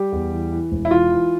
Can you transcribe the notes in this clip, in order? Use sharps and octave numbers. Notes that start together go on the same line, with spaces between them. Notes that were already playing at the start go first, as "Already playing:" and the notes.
Already playing: G3 G4
E2
E3
E3
E1
E4
E3 F4
E3